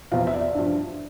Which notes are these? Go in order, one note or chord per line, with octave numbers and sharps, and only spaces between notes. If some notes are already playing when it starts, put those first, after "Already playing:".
E2 C3 F3 F5
E5
D5
G2 F3